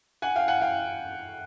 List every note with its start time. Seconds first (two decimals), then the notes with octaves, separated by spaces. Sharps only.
0.22 F#5 G#5
0.36 F5 G5
0.48 F#5 G#5
0.61 F5 G5